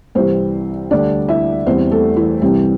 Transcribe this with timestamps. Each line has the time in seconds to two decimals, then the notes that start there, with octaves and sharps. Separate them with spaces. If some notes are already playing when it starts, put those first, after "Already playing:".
0.15 C2 C3 E3 G3 C4 C5
0.91 D2 D3 G3 D4 D5
1.29 E4 E5
1.66 E2 E3 G3 C4 C5
1.92 A3 A4
2.16 E3 E4
2.42 C2 C3 E3 G3 C4